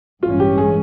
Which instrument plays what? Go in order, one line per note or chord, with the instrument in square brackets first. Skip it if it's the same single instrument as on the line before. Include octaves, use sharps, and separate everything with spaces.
[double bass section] A1 G2 E3 G#3 C#4 [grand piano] F4
[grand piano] G4
G#4